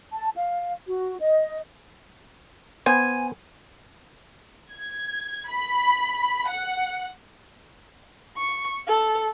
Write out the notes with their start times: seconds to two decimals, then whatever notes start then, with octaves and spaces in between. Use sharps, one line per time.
0.12 A5
0.36 F5
0.87 F#4
1.20 D#5
2.86 B3 C5 G#5
4.73 G#6
5.48 B5
6.49 F#5
8.37 C#6
8.88 A4